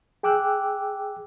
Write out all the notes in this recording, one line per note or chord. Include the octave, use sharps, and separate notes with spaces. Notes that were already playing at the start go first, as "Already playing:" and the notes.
G#4 G5 D6 E6 F#6